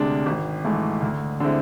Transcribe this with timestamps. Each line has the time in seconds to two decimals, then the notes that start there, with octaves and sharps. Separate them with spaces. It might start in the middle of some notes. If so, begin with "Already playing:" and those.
Already playing: D2 C3 G#3 D4
0.26 G#1
0.64 G#2 E3 A3
1.02 D2
1.40 D3 G#3 C4 E4